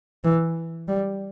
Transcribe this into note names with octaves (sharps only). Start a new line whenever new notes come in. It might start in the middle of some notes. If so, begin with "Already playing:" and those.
E3
G3